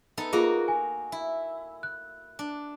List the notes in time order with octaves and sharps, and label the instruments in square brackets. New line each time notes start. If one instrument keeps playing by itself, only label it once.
[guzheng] B3 D#4 A4
[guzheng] A#3 F#4 D#5 [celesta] F4 G#4
[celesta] G#5
[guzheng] E4
[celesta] F#6
[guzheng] D4